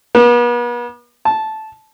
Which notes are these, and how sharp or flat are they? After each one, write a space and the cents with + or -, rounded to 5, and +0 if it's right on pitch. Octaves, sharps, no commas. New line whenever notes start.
B3 -40
A5 -10